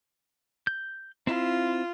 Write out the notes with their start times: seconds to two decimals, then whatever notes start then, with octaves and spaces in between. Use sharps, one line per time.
0.67 G6
1.27 C4 E4 F4